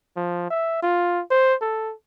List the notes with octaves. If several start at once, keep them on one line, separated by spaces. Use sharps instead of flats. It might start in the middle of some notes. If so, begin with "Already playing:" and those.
F3
E5
F4
C5
A4